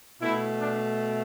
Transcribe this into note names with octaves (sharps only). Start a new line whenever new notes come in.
B2 A3 E4
D4